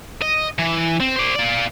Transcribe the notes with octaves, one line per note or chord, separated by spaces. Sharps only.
D#5
E3
C4
C5 D5
F4 D5